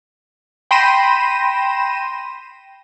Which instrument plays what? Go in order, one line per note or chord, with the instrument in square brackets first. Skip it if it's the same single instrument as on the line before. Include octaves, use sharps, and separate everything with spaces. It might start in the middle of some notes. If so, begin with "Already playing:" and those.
[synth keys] G5 B5 C6 A#6 D#7 E7